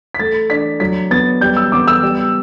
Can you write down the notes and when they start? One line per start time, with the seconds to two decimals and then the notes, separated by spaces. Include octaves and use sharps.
0.14 B6
0.19 A3 A6
0.50 D4 B6
0.80 F#3 B6
1.11 B3 A6
1.41 G3 G6
1.57 E6
1.72 B3 D6
1.88 E6
2.03 G3